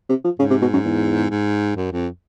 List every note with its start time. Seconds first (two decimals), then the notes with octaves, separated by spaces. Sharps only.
0.09 C3
0.24 F3
0.39 G#2 C#3
0.50 C3
0.62 B2
0.73 F#2
0.85 E2
1.30 G#2
1.76 F#2
1.91 F2